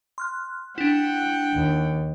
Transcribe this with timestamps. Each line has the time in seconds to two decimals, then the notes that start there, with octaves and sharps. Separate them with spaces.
0.18 C6 F6 F#6
0.78 D4 E4 F#5 G5
1.54 D#2